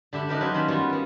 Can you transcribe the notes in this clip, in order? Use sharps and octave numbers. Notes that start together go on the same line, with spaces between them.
D3 G4 E5 B5
D4 D#4 G4 A#4 B4
F#3 A#3 C4 G4 B4
D#3 C#4 B4 C5 A#5 B5
G3 B3 F4 F#4
A#3 B3